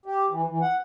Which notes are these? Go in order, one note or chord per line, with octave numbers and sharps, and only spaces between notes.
G4
E3
E3
F#5